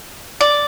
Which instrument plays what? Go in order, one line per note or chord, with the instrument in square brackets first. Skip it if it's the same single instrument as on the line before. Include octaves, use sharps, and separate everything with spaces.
[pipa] D5